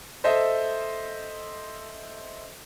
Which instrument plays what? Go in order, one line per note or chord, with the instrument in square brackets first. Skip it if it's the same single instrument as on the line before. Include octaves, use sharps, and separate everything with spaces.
[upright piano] A4 C5 D#5 E5